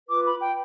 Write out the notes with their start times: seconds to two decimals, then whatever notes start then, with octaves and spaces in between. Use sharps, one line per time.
0.08 F4 B4 D6
0.24 B5
0.40 G5